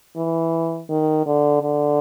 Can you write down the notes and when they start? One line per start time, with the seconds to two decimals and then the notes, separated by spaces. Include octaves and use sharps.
0.16 E3
0.89 D#3
1.26 D3
1.63 D3